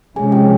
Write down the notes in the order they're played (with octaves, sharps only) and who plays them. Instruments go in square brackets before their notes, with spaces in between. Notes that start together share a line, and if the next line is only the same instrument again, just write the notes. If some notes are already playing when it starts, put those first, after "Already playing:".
[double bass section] C3 F3 G#3 C#4 [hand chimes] G#4 G#5
[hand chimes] G4 G5